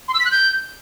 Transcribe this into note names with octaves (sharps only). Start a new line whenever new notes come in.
C6
E6
B6
F#6
G6